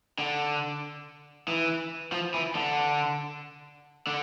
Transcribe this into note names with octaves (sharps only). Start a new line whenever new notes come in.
D3
E3
F3
E3
D3
D3